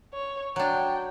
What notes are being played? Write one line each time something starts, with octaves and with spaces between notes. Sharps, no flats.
C#5
F#3 D4 G5